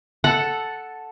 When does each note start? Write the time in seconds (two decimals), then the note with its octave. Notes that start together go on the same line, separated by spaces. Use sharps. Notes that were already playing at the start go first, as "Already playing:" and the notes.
0.24 A4 F#5